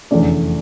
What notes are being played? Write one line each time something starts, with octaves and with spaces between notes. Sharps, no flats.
F1 E2 D3 A3 C#4 D5